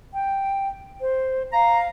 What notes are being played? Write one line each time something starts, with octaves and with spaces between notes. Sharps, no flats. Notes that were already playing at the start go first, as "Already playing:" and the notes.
G5
C5
F5 A#5